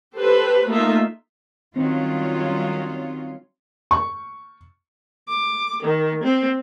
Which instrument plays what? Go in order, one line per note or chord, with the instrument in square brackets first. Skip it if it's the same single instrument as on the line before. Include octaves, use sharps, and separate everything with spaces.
[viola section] G4 A4 B4 C5
A3 A#3 D#4 F4 E5
[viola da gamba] D#3 F#3 [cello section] G3 C#4 F4 [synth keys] C4 D#4
[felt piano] C#6
[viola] D6
D#3
C4